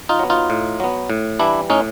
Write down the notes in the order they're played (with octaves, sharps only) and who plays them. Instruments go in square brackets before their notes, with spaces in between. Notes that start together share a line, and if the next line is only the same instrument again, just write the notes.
[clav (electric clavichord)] D#4 F4
F#3 B3
D#4 F4
A2
F#3 B3
A2
E3 G3 D4 E4
A2 C#4 D#4